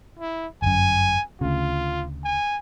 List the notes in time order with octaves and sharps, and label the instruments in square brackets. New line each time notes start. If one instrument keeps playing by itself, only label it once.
[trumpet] E4
[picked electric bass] G1 F#2 [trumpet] G#5
[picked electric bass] D2 C#3 [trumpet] F4
[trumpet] G#5